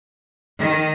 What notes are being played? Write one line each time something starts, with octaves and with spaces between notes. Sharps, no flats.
D#3